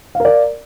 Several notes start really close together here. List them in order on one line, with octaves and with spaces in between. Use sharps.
F5 A#4 D5